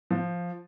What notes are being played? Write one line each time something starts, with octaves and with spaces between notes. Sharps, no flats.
F3